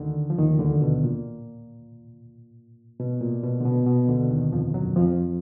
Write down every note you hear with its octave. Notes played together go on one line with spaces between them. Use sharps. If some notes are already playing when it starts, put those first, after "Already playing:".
Already playing: D2 D3 D#3
F3
D#2 D#3
D2 D3
B2
A#2
B2
A#2
B2
D3
B2
A#2
B2
D2 D3
D#2 D#3
F2 F3
F#2 F#3
F2 F3